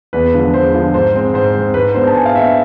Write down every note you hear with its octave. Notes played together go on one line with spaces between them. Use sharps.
E2 B4
D3 F3 G#3
E2 C5
D3 F3 G#3
G#2 C5
G#3 C4
G#2 C5
G#3 C4
G#2 B4
G#3 B3 D4 C5
A5
G#2 G#5
F5
G#3 B3 D4 E5